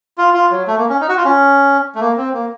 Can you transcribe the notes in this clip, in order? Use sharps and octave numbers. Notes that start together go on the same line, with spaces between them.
F4
F4
F#3
A3
A#3
C#4
D#4
F#4
F4
C#4
A3
A#3
C4
A#3